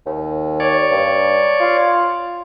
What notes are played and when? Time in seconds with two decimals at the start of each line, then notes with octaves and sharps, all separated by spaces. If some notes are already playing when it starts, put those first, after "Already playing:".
0.06 D#2
0.60 C#5 D5
0.91 G2
1.60 F4